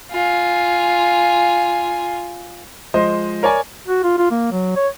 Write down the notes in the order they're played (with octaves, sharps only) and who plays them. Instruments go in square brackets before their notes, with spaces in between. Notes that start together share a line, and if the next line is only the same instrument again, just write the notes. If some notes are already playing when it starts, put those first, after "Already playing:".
[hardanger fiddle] F4 G#5
[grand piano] F3 G#3 C5 D#5
A#4 C#5 D5 G#5
[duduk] F#4
F4
F4
A#3
F#3
C#5